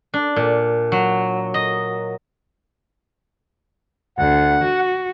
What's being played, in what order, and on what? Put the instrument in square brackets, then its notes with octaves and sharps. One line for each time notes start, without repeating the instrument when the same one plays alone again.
[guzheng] D4
A#2
F#3
D#5
[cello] D2 [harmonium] F#5
[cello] F#4